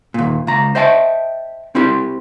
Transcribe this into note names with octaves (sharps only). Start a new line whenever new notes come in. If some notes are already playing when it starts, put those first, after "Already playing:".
D#2 A#2
C#2 A#5
C5 D#5 E5 G5 A5
C4 E4 G4